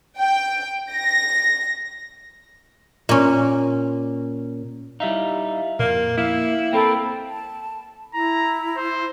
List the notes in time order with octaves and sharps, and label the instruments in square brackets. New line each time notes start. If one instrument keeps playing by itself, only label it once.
[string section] G5
A#6
[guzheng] A#2 C#4
[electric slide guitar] G3 D#4 [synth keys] E4 E5 F5
[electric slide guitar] F2 [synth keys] A#2 [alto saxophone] A#3
[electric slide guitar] A#3 [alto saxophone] E4 [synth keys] E5 F5
[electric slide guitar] A#3 C4 [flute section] A4 G5 B5
[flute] A5
[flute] E4 [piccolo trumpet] A#5
[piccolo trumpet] C5